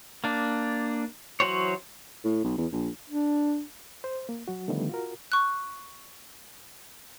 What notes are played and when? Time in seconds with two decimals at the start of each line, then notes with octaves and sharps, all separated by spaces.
0.24 A#3 D4
1.40 E3 F#3 F#4 C5 C#5
2.25 A2
2.44 B1
2.58 E2
2.72 A#1
3.10 D4
4.04 C5
4.29 A#3
4.48 F#3 F#4
4.68 D3 D#3 F3 G3 A3 B3
4.89 F4 F#4 A#4
5.32 C#6 F#6